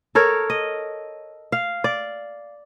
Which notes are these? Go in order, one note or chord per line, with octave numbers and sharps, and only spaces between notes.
A4 A#4 C#5
D#5
F5
D5